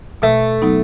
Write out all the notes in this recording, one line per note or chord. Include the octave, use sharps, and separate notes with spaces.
B2 A3
F#3 B3 D#4